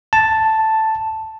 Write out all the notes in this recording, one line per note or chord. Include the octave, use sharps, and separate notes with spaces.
A5